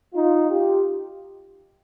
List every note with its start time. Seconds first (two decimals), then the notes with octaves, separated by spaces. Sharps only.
0.14 D#4 F4
0.49 F4 G4